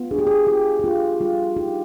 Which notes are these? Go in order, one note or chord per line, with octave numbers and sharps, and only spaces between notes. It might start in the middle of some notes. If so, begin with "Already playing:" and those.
Already playing: B3 F4
D4 G#4
G4
G#4
F4 G4
G4
D4 F4
G3 F4
D#4 G4